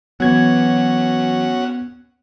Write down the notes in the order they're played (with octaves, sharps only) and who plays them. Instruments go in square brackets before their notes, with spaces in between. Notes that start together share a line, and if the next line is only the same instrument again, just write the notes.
[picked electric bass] E3 F#3 [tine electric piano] B3 G#6 [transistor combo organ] C#4 F#4 F#5